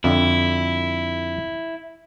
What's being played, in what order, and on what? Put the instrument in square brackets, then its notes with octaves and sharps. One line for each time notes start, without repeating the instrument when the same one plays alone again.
[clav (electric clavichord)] F2 D3 [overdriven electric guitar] E4